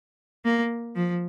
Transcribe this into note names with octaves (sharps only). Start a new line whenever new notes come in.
A#3
F3